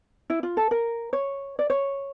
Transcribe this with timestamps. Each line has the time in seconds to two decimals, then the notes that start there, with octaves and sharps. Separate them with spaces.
0.30 E4
0.43 F4
0.57 A4
0.71 A#4
1.13 C#5
1.59 D5
1.70 C#5